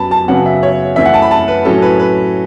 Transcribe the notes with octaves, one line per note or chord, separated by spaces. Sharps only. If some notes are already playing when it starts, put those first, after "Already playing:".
Already playing: F#2 F#3 B3 A5 B5
A5
F#2 C#3 F#3 B3 F#5
E5
C#5
F#2 E3 A3 E5
F#5
A5
B5
A5
B4
A2 F#3 C#4 A4
B4
B4